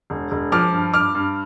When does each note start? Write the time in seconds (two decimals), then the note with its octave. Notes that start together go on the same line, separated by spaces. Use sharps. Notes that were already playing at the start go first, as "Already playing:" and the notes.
0.10 E1
0.31 E1
0.52 F3 D6 F6
0.73 G2
0.94 G2 D6 F6
1.15 G2